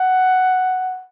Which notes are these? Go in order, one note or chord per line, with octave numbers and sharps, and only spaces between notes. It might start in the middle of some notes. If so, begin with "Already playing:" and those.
Already playing: F#5